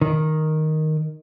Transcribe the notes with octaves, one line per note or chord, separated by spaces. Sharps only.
D#3